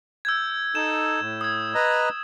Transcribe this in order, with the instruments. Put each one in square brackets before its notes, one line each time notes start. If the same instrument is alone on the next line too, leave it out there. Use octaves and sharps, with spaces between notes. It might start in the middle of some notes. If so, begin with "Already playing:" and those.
[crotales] E6 G6 G#6
[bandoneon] D#4 A4 [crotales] E7
[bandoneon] A2
[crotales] D#6 G#6
[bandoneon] B4 D#5 A#5